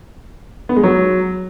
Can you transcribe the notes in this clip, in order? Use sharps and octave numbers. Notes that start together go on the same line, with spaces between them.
B3
G#3
F#3